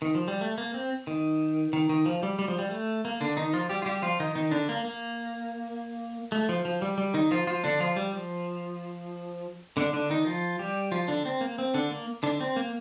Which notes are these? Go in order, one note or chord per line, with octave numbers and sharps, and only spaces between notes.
D#3
F3
G3
A3
A#3
C4
D#3
D#3
D#3
F3
G3
G3
F3
G3
A3
A#3
D3 D4
D#3 D#4
F3 F4
G3 G4
F4
G3 G4
F3 F4
D#3 D#4
D#3 D#4
D3 D4
A#3
A#3
A3
F3
F3
G3
G3
D#3 D#4
F3 F4
F3 F4
D3 D4
F3 F4
G3
F3
D3 D4
D3 D4
D#3 D#4
F3 F4
G3 G4
F3 F4
D3 D4
C4
A#3
C4
D3 D4
A#3
D3 D4
C4
A#3